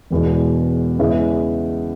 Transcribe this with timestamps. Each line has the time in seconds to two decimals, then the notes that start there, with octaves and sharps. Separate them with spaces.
0.10 E1 E2 B2 G#3
0.99 E2 C#3 G#3 C#4 E4